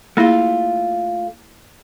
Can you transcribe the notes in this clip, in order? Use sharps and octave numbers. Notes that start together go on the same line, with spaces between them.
A3 A#3 E4 F4 G#4